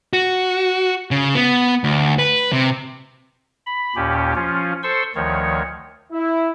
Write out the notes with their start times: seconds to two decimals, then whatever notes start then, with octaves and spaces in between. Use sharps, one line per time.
0.13 F#4
1.11 C#3
1.35 B3
1.84 D2
2.19 B4
2.53 C3
3.66 B5
3.96 D#2 A#2 C#4 G4
4.35 F3 C#4 F4
4.83 A4 C5 C6 C#6 E6
5.15 D2 D#3 F3 C#5
6.12 E4